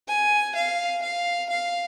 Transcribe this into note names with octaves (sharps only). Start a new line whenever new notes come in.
G#5
F5
F5
F5